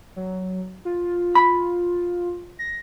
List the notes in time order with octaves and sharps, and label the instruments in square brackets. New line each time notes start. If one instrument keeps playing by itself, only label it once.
[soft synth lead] F#3
F4
[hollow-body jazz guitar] B5
[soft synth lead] A#6